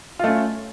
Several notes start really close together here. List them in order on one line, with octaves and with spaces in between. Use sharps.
F4 A3 C#4